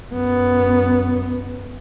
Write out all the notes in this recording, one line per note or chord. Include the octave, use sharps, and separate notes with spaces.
F#2 B3